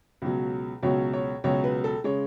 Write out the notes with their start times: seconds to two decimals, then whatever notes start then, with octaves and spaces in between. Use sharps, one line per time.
0.22 C#2 B2 F#3
0.83 C#2 B2 F#3 C#5
1.13 C#5
1.44 C#2 B2 F#3 C#5
1.64 B4
1.84 A4
2.04 C#3 G#3 C#5